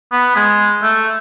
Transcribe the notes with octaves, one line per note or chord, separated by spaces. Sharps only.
B3
G#3
A3